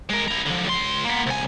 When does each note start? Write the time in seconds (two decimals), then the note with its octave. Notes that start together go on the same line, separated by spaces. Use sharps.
0.10 G#3 A#4
0.28 E4 A#5
0.46 D3 F3
0.65 C#2 C6
1.05 A#3 B3
1.27 C2 G#5